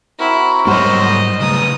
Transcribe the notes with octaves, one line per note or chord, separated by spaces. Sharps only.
C4 E4 F#4 A#4
G#2 F#3 G3 C5 C#5 D#5
C#3 A3 B4 A#5 D#6